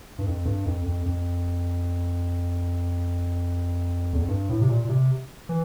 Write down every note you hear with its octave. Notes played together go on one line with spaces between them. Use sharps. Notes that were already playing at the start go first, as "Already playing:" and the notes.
G2
F2
G2
F2
F2
F2
E2
F2
G2
A2
C3
A#2
A#2
C3
E3